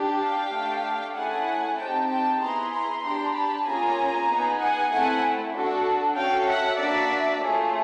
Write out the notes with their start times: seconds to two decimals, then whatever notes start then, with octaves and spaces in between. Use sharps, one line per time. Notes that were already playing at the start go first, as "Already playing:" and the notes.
Already playing: D4 G4
0.21 F5 G5
0.52 A3 D4 G4
1.15 A3 C#4 E4 G#4 F#5 G#5
1.77 C4 D#4 G4 G5 A5
2.09 G5 A5
2.40 B3 E4 G#4 A#5 C6
2.72 A#5 C6
3.03 D4 G4 A#5 C6
3.35 A5 B5
3.65 A#3 C#4 F4 G#4 G#5 A#5
4.28 B3 D#4 G#4
4.59 F#5 G#5
4.91 A3 C4 E4 F#5 G#5
5.54 D4 F#4 A4
6.16 C#4 F#4 A4 F5 G5
6.48 E5 F#5
6.79 A#3 D4 F#4 D5 E5
7.42 A3 C#4 F4 G#4